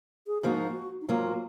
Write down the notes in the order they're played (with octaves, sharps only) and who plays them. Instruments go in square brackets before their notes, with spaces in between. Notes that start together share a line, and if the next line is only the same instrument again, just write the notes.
[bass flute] G#4
[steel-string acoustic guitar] G#2 F3 A#3 D#4 [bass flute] F#4
[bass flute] D#4
[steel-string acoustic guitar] G#2 F#3 A#3 [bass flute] F4